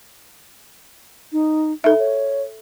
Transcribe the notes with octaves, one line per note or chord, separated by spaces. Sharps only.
D#4
D#4 A4 E5
C#5